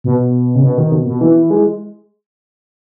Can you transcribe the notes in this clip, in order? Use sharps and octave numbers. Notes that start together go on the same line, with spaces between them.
B2
C#3
B2
D#3
B2
B2
E3
G#3